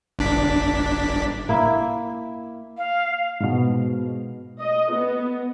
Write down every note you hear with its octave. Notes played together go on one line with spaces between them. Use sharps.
G1 D4 B6
A#3 E4 E5
F5
G#2 B2
D#5
B3